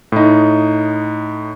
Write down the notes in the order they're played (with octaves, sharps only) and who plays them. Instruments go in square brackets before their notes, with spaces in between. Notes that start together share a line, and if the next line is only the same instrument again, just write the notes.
[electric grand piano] A2 D#4